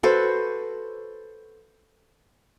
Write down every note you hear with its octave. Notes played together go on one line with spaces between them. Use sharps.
F#4 A4 B4 C5